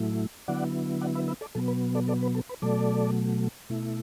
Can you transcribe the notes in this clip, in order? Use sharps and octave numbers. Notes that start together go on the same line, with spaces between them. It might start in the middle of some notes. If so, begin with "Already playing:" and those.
Already playing: A2 F#3 A3 E4
D3 F#3 B3 E4 D5 F#5
D5 F#5
B4 E5
B4 E5
A4 D5
B2 F#3 B3 A4
B4
A4 D5
A4 D5
B4
A4
B4
B2 F#3 A3 A4 D5
B2 A3 E4